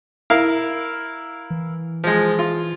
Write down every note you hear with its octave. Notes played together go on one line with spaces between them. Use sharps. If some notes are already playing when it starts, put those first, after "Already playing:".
E4 A#4 F5
E3
F3 G#3
F4